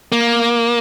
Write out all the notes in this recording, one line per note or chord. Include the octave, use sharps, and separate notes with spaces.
A#3